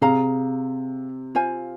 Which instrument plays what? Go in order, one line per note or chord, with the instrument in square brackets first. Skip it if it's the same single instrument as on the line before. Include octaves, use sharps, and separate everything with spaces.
[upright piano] C3 [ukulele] G#4 F5 A#5
[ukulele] F4 C5 F5 G#5